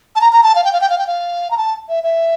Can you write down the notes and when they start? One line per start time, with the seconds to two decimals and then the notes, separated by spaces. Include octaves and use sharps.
0.16 A5
0.21 A#5
0.32 A#5
0.43 A5
0.55 F5
0.65 G5
0.73 F5
0.81 G5
0.90 F5
0.98 G5
1.07 F5
1.51 A#5
1.58 A5
1.89 E5
2.04 E5